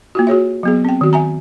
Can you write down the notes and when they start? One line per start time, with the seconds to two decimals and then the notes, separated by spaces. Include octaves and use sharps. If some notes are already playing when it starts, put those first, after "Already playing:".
0.15 A#3 F4 F#4
0.27 F#4 G#4 C#5 E5
0.63 F#3 B3 G#4
0.85 C4 G5
1.01 D#3 F#4
1.13 E5 G#5 A#5